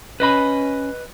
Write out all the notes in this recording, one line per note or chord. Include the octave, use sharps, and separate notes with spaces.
C#4 B4 D#5 B5